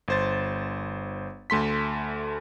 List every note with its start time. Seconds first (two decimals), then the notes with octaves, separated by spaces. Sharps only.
0.08 G1 C5 A6
1.50 D2 A3 C6 B6